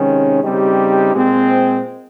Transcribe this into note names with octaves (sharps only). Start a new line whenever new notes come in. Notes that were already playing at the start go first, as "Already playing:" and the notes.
Already playing: C3 D#3 G#3 C#4
C#3 G3 C4 D#4 G4
A#2 G#3 C4